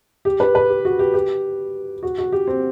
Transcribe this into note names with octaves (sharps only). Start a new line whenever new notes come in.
G4
B4
B4
G4
F#4
G4
G4
F#4
F#4
G4
C4